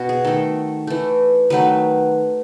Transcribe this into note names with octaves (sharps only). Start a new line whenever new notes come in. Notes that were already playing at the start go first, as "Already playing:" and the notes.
Already playing: B2 B3 F#4
G#4
D#3 A3 A4
E3 A3
D#3 F#3 A3 B4